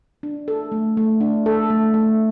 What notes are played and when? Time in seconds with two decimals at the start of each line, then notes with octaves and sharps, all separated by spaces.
0.23 D4
0.48 A4
0.72 A3
0.97 A3
1.21 D4
1.46 A4
1.70 A3
1.94 A3